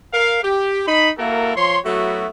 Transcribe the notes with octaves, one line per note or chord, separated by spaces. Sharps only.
A#4 F5
G4
D#4 B5
A#3 E4 F#4 A4 A#4
F3 C#5 C6
F#3 A3 B3 E4 F#4